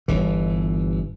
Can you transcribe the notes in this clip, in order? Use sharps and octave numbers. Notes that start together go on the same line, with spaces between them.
G1 E3